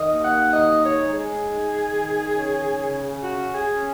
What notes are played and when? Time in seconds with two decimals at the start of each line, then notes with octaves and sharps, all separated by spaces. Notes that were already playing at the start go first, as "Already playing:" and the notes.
Already playing: D#3 D#5
0.09 D#2
0.24 F#5
0.53 D#4 D#5
0.84 C#5
0.99 G#3
1.13 G#4
1.44 D#4
1.89 D#3
2.34 C#4
2.79 C#3
3.24 C#4 F#4
3.54 G#4
3.69 C#4